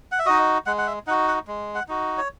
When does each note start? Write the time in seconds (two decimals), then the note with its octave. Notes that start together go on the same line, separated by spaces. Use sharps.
0.12 F#5
0.19 E5
0.26 D#4 F#4 D#5
0.66 G#3 F#5
0.78 F#5
0.87 E5
1.07 D#4 F#5
1.10 F#4
1.28 F#5
1.47 G#3
1.75 F#5
1.88 D#4 F#4
2.17 C#5